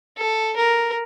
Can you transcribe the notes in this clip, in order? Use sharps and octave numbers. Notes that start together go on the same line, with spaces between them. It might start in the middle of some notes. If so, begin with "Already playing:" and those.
A4
A#4